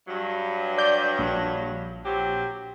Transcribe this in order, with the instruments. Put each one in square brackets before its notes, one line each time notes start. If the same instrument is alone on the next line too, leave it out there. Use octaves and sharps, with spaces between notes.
[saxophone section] G2 F#3
[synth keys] D5 G6
A#1
[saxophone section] F#3 C4 G4